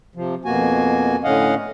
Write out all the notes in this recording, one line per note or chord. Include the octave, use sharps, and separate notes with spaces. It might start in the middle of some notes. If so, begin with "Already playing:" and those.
C3 F3
F2 B2 A#3 F#4 G#5
A2 D3 C#4 D#5 F5 F#5